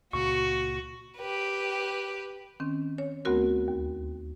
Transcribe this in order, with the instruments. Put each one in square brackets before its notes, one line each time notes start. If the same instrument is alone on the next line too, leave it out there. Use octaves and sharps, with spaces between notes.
[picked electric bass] C#2 A#2 [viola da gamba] F#4 [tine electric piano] C#6
[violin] G4 B4
[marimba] D#3 C4 C#4
C#5
D2 A3 B3 C4 F#4 A#4
D#2